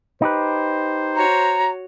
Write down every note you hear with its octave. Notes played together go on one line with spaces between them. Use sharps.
D#4 G4 B4 C5
F#4 C#5 A#5